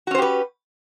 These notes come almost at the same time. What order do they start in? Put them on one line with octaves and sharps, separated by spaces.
F#4 C#4 C5 G4 B4